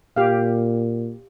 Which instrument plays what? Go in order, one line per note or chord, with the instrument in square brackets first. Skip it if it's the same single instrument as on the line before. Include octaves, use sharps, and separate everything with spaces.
[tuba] A#2 [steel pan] G4 F5